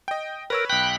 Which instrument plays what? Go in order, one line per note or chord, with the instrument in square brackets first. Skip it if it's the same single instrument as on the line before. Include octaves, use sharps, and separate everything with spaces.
[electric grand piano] D#5 G5
[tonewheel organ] A#4 [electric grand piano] B4 C#5 E6
[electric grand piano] B1 B6 [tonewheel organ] G5 B5 F#6